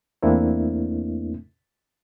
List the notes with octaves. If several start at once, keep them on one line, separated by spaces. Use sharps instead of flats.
E2 A3 A#3 C4 D4 E4